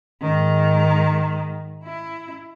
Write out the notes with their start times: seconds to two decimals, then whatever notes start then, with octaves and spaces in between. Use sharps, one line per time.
0.21 G#2 D#3
1.84 E4